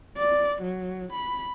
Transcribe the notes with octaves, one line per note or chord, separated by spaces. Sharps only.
D5
F#3
B5